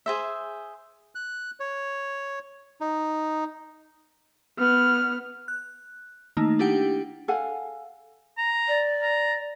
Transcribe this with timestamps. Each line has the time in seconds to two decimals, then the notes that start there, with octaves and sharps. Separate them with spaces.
0.06 G#4 C5 E5
1.15 F#6
1.60 C#5
2.81 D#4
4.58 B3 F6
5.48 F#6
6.37 D#3 A3 A#3 D#4
6.59 D4 E4 G4 F#5 G5
7.28 A4 F5 F#5 G#5
8.38 A#5
8.68 D5
9.03 A#5